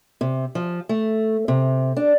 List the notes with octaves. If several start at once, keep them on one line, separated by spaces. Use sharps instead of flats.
C3
F3
A3
C3
D4